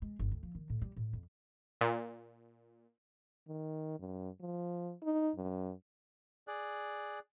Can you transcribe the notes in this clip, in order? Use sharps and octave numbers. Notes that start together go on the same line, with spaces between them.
G#3
G1
D2
F3
D#3
A2
G3
A2
F2
A#2
D#3
F#2
F3
D#4
F#2
G#4 D5 F#6